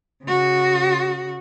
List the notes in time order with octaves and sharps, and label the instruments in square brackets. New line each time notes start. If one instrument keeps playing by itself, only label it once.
[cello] C#3 F#4